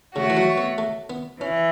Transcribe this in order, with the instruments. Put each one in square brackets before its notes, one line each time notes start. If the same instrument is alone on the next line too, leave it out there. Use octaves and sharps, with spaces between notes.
[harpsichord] C#3 [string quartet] A3 F#4 C#5
[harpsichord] E3
F#3
B3
A3
B3
[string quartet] E3 [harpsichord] C#4